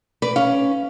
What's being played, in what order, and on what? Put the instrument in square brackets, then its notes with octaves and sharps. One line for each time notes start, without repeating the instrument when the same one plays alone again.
[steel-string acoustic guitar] B4 D5
[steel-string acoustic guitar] C#4 [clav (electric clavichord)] F5